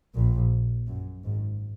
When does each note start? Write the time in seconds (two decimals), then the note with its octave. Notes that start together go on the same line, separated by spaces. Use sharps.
0.14 A#1 A#2
0.87 F#2
1.24 G#1 G#2